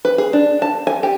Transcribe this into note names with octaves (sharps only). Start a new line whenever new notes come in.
B4
G#4
D4
A5
G#5
G4